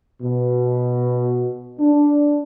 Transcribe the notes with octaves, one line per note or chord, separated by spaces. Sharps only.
B2
D4